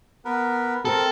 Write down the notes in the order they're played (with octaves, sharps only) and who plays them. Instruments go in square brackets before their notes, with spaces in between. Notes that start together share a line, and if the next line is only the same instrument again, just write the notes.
[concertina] B3 A#4 B4
[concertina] C4 A#4 [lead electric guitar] A4